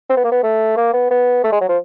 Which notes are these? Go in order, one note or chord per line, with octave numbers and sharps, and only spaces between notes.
C4
B3
A#3
B3
A3
A#3
B3
B3
A3
G#3
F#3
F3